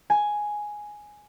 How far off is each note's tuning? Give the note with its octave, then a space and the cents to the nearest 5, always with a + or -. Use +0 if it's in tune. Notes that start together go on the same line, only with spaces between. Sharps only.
G#5 +5